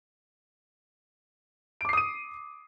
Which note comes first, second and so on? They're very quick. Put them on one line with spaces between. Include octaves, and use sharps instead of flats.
D7 D6 C7 D#6 D#7